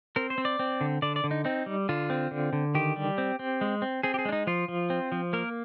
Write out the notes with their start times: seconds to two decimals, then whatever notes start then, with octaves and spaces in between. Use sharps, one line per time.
0.16 C4 A#4
0.30 C5
0.38 C4
0.45 D5
0.59 C4
0.81 D3
1.02 D3 D5
1.16 D5
1.24 D3
1.31 D#4
1.45 C4 D#4
1.66 G3
1.89 D3 F4
2.10 C4
2.31 D3
2.53 D3
2.75 D#3 G4
2.96 G3
3.18 C4
3.39 C4
3.61 G#3
3.82 C4
4.03 C4 G#4
4.14 G4
4.19 G#4
4.25 G#3 D4
4.32 D#4
4.47 F3 F4
4.68 F3
4.90 C4
5.12 F3
5.33 A#3 A#4